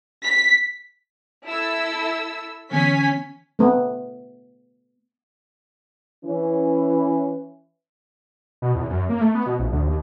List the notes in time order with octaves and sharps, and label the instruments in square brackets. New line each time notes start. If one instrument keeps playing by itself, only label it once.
[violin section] B6
E4 A4 E6
[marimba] D3 E3 B3 [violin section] C#4 G#5 B6
[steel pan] A3 B3
[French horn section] E3 C#4
[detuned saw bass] B2
E2
F#2
A#3
A3
B3
B2
A#1
D2
D#2